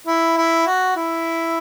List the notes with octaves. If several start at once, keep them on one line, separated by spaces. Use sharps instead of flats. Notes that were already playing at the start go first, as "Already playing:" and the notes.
E4
E4
F#4
E4